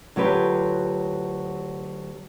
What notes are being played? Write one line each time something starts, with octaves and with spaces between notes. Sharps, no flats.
D2 F#3 F4 G4 B4